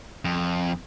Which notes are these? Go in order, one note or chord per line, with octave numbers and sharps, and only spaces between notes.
F2